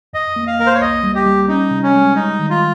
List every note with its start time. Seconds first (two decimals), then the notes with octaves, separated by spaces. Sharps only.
0.13 F2 D#5
0.36 A#3
0.47 F5
0.59 A#3 A#4
0.66 C5
0.74 C#5
0.81 C2 D#5
1.03 G3
1.15 G4
1.26 G3
1.48 C#4 D#4
1.71 C3
1.83 C#4
1.94 G#3
2.16 G3 D#4
2.39 D#3
2.50 F4